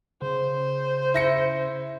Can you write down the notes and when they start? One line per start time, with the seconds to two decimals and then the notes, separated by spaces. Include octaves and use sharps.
0.22 C#3 C5
1.14 E4 A#6 C#7